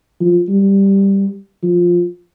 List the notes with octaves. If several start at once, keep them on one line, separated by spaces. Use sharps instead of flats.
F3
G3
F3